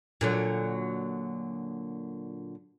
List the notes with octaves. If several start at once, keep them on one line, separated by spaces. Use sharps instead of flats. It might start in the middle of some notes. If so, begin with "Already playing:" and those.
A#2 D3 F#3